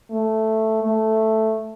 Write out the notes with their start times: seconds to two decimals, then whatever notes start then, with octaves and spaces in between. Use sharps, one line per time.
0.11 A3
0.83 A3